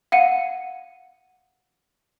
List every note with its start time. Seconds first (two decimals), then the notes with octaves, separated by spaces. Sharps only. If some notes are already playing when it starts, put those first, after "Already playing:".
0.12 F5 F#5 C#7 D#7